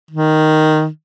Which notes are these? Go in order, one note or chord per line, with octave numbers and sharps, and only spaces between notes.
D#3